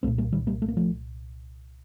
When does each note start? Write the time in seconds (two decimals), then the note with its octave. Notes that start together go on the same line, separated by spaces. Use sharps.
0.03 C2 A3 C4
0.07 A#2
0.18 G3 A#3
0.32 D#3 G3
0.47 G3 A#3
0.62 A3
0.68 A#3
0.77 F3 A3